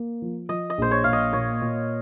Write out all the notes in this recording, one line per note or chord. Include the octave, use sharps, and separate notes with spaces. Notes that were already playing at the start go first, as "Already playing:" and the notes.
Already playing: A#3
F3
F3 D#5
D#5
A#1 C5
C#5
A#1 F5
D#5
A#2 C#5
A#2